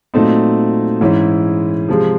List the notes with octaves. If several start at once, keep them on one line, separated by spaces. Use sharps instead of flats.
A#2 F#3 A3 C4 D#4
G#2 E3 G#3 C#4 E4
C3 F3 G#3